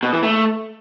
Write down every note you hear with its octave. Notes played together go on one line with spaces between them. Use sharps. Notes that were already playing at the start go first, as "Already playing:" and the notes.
B2
E3
A3